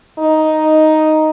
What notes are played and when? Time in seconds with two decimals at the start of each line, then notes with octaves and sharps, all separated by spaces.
0.19 D#4